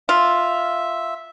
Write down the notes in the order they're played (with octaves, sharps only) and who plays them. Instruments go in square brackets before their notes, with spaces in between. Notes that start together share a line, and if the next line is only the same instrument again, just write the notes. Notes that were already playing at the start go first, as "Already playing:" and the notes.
[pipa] F4 [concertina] E5